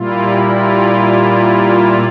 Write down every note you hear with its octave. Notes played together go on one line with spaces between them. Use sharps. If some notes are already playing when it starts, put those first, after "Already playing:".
Already playing: A#2 G3 A#3 E4 F4
F4